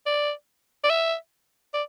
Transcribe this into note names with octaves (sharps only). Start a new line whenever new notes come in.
D5
D5
E5
D5